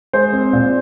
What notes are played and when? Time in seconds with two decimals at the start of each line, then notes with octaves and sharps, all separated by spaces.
0.13 G#3 C5
0.33 C4
0.53 A#2